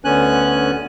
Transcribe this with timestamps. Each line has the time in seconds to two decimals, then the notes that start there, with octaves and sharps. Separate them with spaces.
0.05 D2 D3 B3 C#4 G#5 F#6